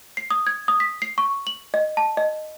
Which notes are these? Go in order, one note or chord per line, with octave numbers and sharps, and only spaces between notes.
C7
D#6
G#6
D#6
B6
C7
C#6
F#7
D#5
A5
D#5